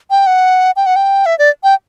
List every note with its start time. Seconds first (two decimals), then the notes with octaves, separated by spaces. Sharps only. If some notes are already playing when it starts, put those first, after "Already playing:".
0.10 G5
0.27 F#5
0.76 G5
0.86 F#5
0.96 G5
1.26 E5
1.39 D5
1.63 G5